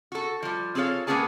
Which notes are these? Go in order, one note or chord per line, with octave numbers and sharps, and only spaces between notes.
F#4 A4
F3 G3
C4 F4 G#4 A4 C#5 F5
G#3 A#3 B3 C#4 G#4 A5